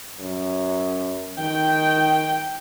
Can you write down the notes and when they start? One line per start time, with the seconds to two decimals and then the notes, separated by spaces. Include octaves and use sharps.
0.20 F#2
1.39 D#3 G5